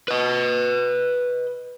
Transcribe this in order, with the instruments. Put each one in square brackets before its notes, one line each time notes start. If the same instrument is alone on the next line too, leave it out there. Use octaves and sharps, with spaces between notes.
[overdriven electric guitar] B4 D#5